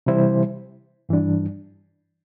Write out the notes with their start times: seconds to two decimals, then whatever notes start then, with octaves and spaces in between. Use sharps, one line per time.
0.06 C3 E3 G3 E4 C5
1.09 G2 E3 G3 D4